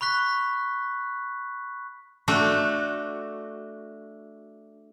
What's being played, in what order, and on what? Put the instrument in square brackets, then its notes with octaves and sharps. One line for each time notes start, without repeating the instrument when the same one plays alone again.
[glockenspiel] B5 C#6 F#6 B6
[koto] A3 D4 F#4